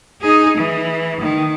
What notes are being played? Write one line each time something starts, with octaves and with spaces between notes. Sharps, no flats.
D#4 G#4
E3
D#3